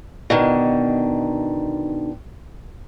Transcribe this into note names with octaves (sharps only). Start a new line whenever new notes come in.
B2 D3 D#3